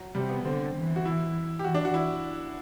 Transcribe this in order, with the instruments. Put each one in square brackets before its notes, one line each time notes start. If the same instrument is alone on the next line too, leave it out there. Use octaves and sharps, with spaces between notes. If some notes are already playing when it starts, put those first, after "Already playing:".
Already playing: [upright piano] F#3
[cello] C3 [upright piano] G3
[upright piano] B3
[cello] D3 [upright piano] C4
[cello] E3
[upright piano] F#4
E4
G4
[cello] E3 [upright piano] F#4
[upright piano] D4
F#4
E4